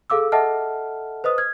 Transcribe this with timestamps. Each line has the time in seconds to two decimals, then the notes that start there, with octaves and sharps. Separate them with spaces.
0.10 G#4 A4 F5 D6 E6
0.32 A4 D#5 E5 F#5 A5 F6
1.24 B4 C5 D#5 D#6
1.38 F6 G#6